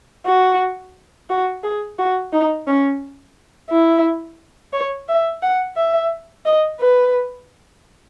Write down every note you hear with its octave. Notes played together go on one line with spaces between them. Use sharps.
F#4
F#4
G#4
F#4
D#4
C#4
E4
C#5
E5
F#5
E5
D#5
B4